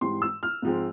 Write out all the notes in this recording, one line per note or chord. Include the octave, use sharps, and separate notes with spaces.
G#2 E3 G3 C4 C6
E6
F6
G#2 F3 G#3 C4